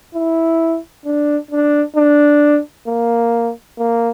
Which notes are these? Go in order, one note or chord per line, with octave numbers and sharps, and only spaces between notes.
E4
D4
D4
D4
A#3
A#3